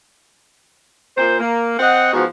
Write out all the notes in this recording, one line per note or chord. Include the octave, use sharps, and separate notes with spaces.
A#2 C5
A#3
C4 D#5 F#5
G#2 F3 B3 F#4